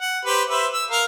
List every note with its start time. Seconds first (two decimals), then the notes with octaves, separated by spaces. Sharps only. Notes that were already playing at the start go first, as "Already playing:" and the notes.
0.01 F#5
0.25 G4 B4 C5
0.50 B4 C5 E5
0.73 E6
0.91 A#4 F5